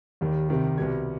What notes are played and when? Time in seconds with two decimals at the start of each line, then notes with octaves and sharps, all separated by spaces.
0.21 D#2 D#3 G3
0.49 C2 C3 D#3 G3
0.78 C2 B2 G3 G#6